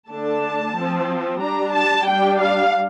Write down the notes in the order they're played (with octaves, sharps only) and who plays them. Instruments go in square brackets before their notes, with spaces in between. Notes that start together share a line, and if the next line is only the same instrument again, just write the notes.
[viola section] D3 A3 D4 A5
F3 C4
G3 D4 A#5
A5
G3 D4 G5
F5